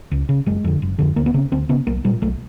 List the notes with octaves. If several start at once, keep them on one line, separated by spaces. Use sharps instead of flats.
C#2
C#3
F#1 G#3
F2 D3
F#1
F2 D3
D2 A#3
B3
C#3 C4
D2 C4
C#3 B3
B1 A#3
A#2 G3
B1 A3